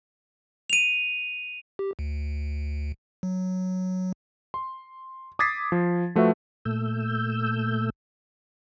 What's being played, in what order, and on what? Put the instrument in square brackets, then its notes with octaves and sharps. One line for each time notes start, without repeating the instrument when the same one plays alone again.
[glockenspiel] D#7 F7
[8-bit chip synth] G4
D2
F#3
[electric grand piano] C6
D6 D#6 G#6 A6 B6 C7
F3
F3 A3 F#4 B4 E5
[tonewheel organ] A#2 A3 E6 G6